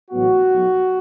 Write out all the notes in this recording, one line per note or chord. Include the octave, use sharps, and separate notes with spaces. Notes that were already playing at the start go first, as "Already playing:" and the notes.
A1 A2 F#3 B3 F#4
B1 B2 F#3